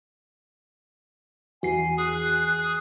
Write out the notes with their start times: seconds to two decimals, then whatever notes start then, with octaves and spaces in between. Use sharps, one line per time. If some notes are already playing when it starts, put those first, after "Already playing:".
1.63 E2 E3 F#4 G#5 C7
1.98 G#4 F#6